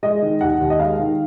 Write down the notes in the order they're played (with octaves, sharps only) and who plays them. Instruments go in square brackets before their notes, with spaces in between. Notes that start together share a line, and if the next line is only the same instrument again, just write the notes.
[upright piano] G#3 D#5
D#3
D#2 F#5
D#2
D#5
G#3 F5
D#3